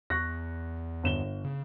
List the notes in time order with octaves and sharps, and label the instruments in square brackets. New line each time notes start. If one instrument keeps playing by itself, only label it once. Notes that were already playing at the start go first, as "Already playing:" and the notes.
[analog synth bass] E2 [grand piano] C#6 F#6 A#6
[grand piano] G1 E7 G7
[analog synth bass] C#3